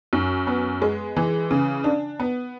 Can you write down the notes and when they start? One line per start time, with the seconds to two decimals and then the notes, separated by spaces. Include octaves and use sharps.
0.13 F#2
0.47 B3
0.82 G#3
1.16 E3
1.51 C#3
1.84 D4
2.20 B3